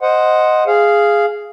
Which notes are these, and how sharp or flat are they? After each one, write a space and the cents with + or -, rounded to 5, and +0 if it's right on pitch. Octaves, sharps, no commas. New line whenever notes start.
C5 +0 D#5 +0 F#5 +0
G#4 +0 F5 -10